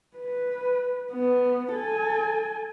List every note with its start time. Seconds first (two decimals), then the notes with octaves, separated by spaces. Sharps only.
0.17 B4
1.12 B3
1.73 A4 G#5